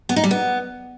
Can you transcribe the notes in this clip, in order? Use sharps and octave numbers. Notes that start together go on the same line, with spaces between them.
B3
D#4
G3
B3